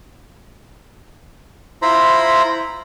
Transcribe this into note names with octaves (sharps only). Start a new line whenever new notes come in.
E4 F4 C5 A#5 B5